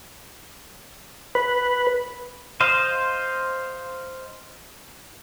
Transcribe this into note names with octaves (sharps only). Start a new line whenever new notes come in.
B4
C5 D#5 F5